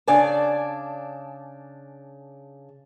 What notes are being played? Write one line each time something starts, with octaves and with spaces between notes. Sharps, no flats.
C#3 D4 D5 G#5 A5